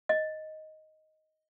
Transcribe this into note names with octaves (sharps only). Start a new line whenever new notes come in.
D#5